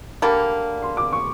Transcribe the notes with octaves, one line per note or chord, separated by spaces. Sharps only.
D3 G3 A#3 B5
C6
D6
C#6